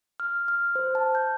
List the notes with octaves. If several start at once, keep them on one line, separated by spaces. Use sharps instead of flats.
F6
F6
C5
A5
G6